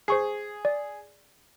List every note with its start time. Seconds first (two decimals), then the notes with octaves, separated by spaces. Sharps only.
0.08 G#4 C5 C#6 C7
0.65 D5